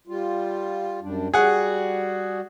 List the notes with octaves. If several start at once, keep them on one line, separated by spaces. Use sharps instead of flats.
G3 F4
F#2 G3 D4
G3 F#4 G#4 F#5